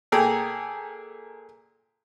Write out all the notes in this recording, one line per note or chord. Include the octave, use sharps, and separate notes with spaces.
A#2 G#4 A4 G5 A#5